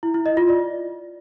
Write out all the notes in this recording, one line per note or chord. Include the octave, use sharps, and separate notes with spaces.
E4
E4
D#5
F4
D5